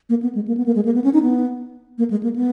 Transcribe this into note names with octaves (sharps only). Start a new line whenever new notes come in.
A#3
B3
G#3
A#3
B3
A#3
G#3
A#3
B3
C#4
D#4
B3
A#3
G#3
A#3
B3